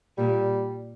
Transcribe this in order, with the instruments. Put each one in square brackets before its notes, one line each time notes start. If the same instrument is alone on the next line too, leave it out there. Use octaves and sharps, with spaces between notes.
[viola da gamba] A#2 [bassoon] G3